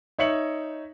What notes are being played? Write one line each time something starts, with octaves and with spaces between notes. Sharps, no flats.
D#4 C#5 E5 C#7 F#7